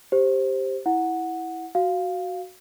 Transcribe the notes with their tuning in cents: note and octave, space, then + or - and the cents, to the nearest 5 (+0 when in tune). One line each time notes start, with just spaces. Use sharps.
G4 +0 C5 +10
E4 -10 F#5 -5
F#4 +0 F5 +0